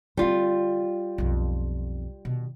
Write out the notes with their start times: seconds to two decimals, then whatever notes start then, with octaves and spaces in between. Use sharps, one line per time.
0.17 D3 G3 C4 F4
1.18 B1 F2
2.25 B2 D#3